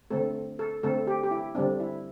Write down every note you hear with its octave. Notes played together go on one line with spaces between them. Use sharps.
D3 A3 C4 A4
A4
D3 A3 C4 A4
G4
G4
E4
D3 G3 C4 D4
E4